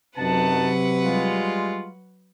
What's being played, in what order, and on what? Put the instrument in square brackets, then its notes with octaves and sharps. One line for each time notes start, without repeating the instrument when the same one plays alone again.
[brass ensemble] F#2 D#4 A5 [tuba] C3 [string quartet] F#3 B4 F#5
[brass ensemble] G3 G#3 F4